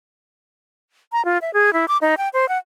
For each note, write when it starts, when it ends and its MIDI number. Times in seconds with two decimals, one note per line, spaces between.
1.12 1.24 82
1.25 1.38 65
1.42 1.53 76
1.54 1.73 68
1.73 1.86 64
1.88 1.97 86
2.02 2.15 63
2.18 2.29 79
2.33 2.48 72
2.49 2.58 78